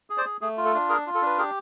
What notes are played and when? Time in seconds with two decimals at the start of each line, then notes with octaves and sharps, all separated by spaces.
0.10 G#4
0.18 C5 D5
0.25 G#4
0.41 A3 G#4
0.57 F4
0.65 A4
0.74 D4
0.89 G#4 A#4
1.07 F4
1.15 A4
1.22 D4 B4
1.38 G4 G#4 A#4